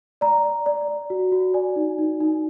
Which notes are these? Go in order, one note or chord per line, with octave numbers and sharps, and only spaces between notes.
D5 A#5
D5
D5
D5
F#4
F#4
D5 G#5
D#4
D#4
D#4